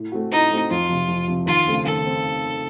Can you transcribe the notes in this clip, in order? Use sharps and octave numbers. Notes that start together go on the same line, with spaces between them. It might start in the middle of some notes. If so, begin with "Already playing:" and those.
Already playing: A2
A3 C4 F#4
A2 D#4
A3 C4 F#4
F2 F4
C3 F3
F2
C3 F3
D#2 F4
C#3 A3 C4
D#2 A4
C4